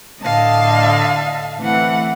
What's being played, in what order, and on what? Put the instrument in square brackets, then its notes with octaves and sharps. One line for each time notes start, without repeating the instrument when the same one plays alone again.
[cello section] A2 D3 D#5 [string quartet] F5 A5
[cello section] E3 C4 [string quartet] A3 F#5